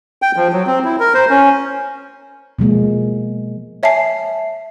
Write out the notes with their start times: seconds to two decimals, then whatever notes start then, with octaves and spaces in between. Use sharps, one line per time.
0.22 G5
0.36 F3
0.53 F#3
0.67 C4
0.85 E4
1.00 A#4
1.14 C5
1.30 C#4
2.59 B2 F3 G#3 A#3
3.83 C#5 E5 G#5 A5 C7